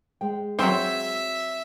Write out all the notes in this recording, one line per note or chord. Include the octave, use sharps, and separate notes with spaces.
G#3 G5
E3 F#3 C4 E5